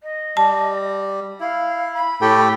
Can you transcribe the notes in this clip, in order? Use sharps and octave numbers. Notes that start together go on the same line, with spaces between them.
D#5
G3 A5
E4 F5
B5
A2 G4 A4 G5